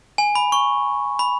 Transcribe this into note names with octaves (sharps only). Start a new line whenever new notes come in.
G#5
B5
C#6
B5